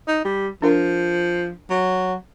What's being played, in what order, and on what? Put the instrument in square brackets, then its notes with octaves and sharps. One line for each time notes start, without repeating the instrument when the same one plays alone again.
[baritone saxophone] D#4
G3
[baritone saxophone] F3 [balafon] D4 A#4
[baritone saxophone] F#3